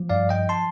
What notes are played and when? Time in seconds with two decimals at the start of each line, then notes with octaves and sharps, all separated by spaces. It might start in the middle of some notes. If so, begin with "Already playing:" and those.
Already playing: F3
0.09 G2 D5 F5
0.29 D#5 G5
0.49 A5 C6